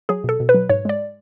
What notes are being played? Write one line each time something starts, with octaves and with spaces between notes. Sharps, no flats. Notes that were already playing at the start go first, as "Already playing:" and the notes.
F#3 G#4
B2 A4
B2
B4
F#3
G#2 C#5
G#3 D5